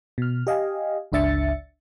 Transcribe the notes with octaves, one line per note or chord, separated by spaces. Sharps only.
B2 F6
G4 D#5 F5 G#5
G1 C#2 D4 E5 A6 C#7